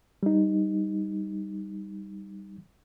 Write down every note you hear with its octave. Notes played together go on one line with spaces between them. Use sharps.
G3 D#4